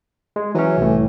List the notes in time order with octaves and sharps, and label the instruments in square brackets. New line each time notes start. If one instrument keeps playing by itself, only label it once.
[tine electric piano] G#3
[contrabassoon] E3 [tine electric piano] F#3 C#4
[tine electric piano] C2 A2